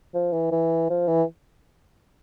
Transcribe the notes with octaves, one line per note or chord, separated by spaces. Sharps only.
F3
E3
E3
F3
E3